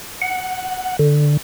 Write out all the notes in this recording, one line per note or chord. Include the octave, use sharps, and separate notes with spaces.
F#5
D3